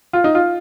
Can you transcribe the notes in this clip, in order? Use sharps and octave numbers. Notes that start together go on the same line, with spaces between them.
F4
D#4
F4